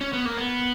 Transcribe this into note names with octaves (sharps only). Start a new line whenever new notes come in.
C#4
B3
A#3
B3